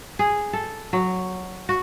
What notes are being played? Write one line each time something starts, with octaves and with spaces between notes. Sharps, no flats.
G#4
A4
F#3
F#4